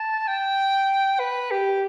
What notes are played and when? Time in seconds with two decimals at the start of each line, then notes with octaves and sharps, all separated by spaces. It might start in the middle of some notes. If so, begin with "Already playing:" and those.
Already playing: A5
0.28 G5
1.19 B4
1.51 G4